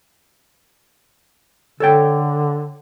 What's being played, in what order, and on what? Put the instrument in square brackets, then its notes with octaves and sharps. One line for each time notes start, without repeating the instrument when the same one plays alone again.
[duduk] D3 [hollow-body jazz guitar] A4 C#5 G5